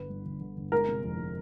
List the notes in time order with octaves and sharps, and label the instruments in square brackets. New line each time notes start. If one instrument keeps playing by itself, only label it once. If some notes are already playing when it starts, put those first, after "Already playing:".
Already playing: [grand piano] G1 D3 [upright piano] B4
[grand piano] G2
G1
D3
G1
[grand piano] G#3 [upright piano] A#4
[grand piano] C3
F2
G#3